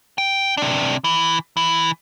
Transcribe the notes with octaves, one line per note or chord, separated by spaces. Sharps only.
G5
C3 D4
E3
E3